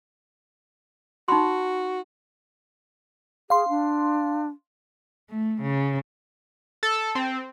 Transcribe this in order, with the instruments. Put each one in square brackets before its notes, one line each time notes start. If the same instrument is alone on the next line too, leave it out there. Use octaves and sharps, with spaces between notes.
[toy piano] D#4 B5 C6 [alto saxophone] F#4
[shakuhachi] G#4 [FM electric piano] F5 C6
[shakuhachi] D4
[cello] A3
C#3
[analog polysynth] A4
C4